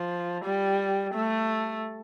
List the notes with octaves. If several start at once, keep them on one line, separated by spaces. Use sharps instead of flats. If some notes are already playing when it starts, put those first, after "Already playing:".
Already playing: F3
G3
A3